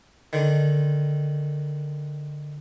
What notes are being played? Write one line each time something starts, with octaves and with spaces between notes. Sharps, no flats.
D3 D#3